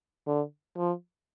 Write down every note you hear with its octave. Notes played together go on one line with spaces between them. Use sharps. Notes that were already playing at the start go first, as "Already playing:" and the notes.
D3
F3